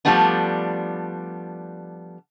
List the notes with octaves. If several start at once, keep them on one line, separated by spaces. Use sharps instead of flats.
F3 G3 A3 B3 D4